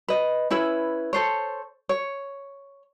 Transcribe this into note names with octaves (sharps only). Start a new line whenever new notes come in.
B4 D#5
C#4 E4 B4 E5
A4 C5 C#5
C#5